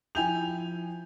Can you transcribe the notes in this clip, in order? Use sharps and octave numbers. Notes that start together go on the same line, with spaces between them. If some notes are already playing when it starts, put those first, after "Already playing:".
F3 E4 G5 G#5 G6 F7